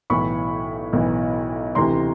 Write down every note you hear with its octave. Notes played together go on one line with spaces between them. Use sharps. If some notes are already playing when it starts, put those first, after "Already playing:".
B1 A2 E3 B5 C#6
B1 A2 E3
D2 C3 E3 A#5 C6